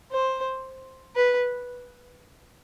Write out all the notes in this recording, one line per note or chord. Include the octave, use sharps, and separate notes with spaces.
C5
B4